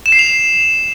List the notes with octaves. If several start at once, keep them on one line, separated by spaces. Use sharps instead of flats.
E7
C7
F7